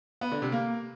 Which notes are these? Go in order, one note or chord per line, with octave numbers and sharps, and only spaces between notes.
B3
D3
C3
A#3